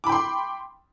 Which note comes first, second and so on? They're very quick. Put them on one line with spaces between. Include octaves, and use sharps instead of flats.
D6 B5 G5 C6